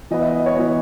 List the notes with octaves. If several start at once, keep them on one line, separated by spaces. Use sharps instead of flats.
E3 B3 D#5
E5
D#5
C#5
E3 B3 D#5